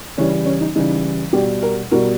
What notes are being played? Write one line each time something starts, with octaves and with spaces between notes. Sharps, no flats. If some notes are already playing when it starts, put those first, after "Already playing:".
C#3 E3 G3 C#4
C#4
D#4
C#3 E3 G3 D#4
B2 G3 G4
A#4
B2 G3 A#4